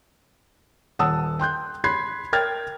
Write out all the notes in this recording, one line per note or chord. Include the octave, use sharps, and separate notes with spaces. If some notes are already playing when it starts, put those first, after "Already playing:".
D#1 F#5 A5 D#6 E6
G5 C6 F#6 G6
B5 C6 F#6 G#6 B6 C7
A#4 G5 F6 G#6 A6